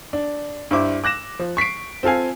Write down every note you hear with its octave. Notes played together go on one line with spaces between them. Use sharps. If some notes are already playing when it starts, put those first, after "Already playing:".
D4
G2 E4 C5 D6
D6 F#6 A#6 E7
F3
C#6 B6 C7 D7
C4 F4 A4 F5 G#5